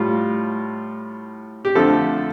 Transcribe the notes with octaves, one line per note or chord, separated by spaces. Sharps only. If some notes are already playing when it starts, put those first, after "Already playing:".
Already playing: A2 G3 F4
G4
F2 D3 F3 A3 A4